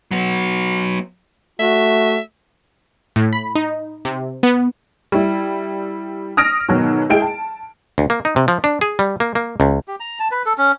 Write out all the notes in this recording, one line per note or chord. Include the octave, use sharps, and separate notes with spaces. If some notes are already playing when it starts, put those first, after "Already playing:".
F#3 B3
A3 F#4 E5
A2
B5
D#4
C3
B3
G3 E4
D#6 F6 A#6 D7
G#2 B2 D#3 F#3
G#3 E4 G#4 G5 D7
A5
D2
A#3
D#4
C3
F3
D4
G#4
G3
A#3
A#3
C#2
G4
A#5
A5
B4
A4
C#4